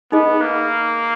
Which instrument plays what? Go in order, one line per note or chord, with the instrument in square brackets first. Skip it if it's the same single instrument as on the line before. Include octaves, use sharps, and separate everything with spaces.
[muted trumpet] B3 [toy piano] D#4 G#4 D#5
[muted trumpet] A#3